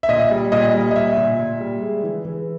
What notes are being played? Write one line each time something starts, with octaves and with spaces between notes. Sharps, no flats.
E5
A#2 D#5
G3
A#2 D#5
G3
D#5
A#2 E5
A#2
A#2
G3
G#3
E3
E3